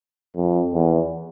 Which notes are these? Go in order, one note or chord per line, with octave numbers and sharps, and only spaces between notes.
F2
E2